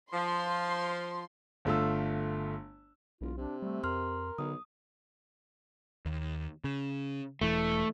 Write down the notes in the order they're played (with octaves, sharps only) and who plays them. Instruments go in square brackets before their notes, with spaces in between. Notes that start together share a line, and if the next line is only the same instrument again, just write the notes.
[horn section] F3 [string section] C6
[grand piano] G1 A3 F4 E6
[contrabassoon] E1 [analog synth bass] B1 [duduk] F4
[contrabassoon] C3 [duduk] D4
[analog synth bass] G3 [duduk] A3
[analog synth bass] F2 [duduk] A#4 [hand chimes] C6 F6
[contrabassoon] B1 [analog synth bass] D3 [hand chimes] D#6
[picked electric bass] D#2
C#3
[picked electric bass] E1 E3 [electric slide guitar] A3